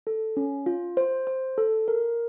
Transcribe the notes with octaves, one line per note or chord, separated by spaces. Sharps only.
A4
C#4
F4
C5
C5
A4
A#4